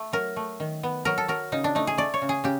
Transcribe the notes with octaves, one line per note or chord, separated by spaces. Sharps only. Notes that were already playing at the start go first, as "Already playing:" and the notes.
Already playing: A3
F#3 A#4
A3
D#3
B3
F#3 A#4
A4
F#3 A#4
C#3 D#4
D4
A3 D#4
G#4
A3 D5
C#5
C#3
G#4
C#3 G4